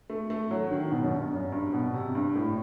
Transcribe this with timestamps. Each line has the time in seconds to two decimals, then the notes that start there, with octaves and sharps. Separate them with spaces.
0.10 A3
0.30 A3
0.51 F#3
0.72 D#3
0.91 B2
1.02 F#2
1.11 G2
1.33 F#2
1.52 G2
1.73 B2
1.94 C3
2.15 G2
2.35 A2